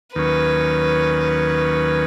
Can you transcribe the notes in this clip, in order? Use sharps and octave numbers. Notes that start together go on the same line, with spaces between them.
D#2 D#3 F#3 C#4 B4